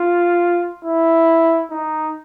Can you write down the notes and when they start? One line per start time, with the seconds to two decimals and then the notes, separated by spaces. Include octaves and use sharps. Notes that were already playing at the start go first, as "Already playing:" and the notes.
Already playing: F4
0.84 E4
1.71 D#4